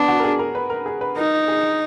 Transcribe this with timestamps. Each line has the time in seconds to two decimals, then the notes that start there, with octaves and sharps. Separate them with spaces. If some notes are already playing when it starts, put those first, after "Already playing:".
Already playing: B3 D4
0.08 F#4
0.20 A#4
0.24 G#4
0.39 A#4
0.55 B4
0.70 A#4
0.86 G#4
1.01 B4
1.16 D#4 A#4
1.48 G#4